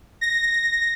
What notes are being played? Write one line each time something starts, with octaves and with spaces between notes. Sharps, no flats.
A#6